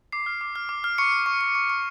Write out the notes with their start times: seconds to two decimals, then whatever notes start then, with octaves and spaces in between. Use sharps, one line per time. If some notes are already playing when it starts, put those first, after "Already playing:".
0.12 D6 C7
0.26 F6
0.41 D6
0.56 F6
0.69 D6
0.84 F6
0.98 C#6 C#7
1.12 C#6
1.26 C#6
1.41 C#6
1.55 C#6
1.70 C#6